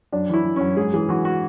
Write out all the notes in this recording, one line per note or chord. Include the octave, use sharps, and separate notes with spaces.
F#2 D4
E3 E4
E3
F#2 C#4
G#2 G#4
E3 G#4
E3 F#4
F#4